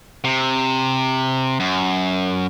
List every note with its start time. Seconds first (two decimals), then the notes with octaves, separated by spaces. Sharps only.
0.24 C3
1.60 F#2